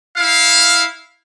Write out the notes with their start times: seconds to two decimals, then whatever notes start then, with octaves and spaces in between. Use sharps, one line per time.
0.17 E4 F5